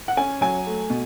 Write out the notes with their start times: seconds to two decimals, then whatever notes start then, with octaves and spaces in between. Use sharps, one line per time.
0.08 F#5
0.17 C#4 G#5
0.41 F#3 G#5
0.66 A3
0.90 B2